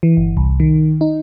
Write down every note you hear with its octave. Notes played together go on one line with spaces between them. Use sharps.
E3
G1
C2
D#3
D#4